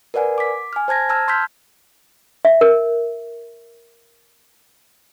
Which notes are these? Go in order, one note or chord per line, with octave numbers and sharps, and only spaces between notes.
A#4 B4 D5 F#5 G#5
D6 B6
G#5 F6
C5 A5 G#6 A#6
A5 A#5 E6 F6 G#6
C6 E6 F6 G6 B6
E5
A#4